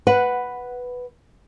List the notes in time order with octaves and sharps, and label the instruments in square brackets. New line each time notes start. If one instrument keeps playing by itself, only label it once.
[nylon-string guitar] B4 F#5